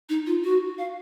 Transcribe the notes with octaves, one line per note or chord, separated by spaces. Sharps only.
D#4
F4
F#4
F5